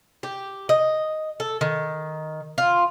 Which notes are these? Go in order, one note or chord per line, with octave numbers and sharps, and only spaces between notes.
G4
D#5
A4
D#3
F4